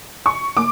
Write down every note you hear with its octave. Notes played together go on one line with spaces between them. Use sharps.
C#6
A#3 D6